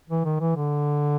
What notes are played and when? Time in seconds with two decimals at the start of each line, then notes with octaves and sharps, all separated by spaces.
0.09 E3
0.25 D#3
0.40 E3
0.56 D3